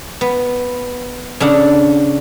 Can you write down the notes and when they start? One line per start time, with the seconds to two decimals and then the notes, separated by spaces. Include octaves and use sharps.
0.21 B3
1.40 C#3 D4 A4 F#5